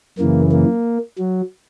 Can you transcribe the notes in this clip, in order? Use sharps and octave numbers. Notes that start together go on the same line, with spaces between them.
F#2 C#3 E3 A#3
A#3
F#3